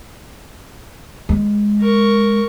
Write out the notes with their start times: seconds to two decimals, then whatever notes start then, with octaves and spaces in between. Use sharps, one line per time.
1.29 G#3
1.80 A#4 C#6